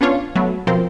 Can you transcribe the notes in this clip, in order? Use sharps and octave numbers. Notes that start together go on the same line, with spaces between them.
B3 C#4 D4 F4 C#5
F#3 A3 B3
B2 F3 C4 A#4 C5